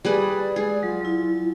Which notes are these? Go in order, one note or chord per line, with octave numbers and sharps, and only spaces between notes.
G3 G#4 B4 D5
G#3 G#4
F#3 F4
F#3 E4